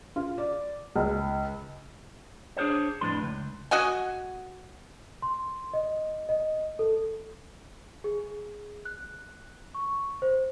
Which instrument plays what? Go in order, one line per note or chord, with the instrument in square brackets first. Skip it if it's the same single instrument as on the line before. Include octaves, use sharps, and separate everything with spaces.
[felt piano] F4
D5
C#2
[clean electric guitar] D4 G#4 A#4 C5 C#5
F2 A2 D4 B4 C6
C#2
[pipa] F#4 D#5 F#5 G#5
[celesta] C6
D#5
D#5
A4
G#4
F#6
C#6
C5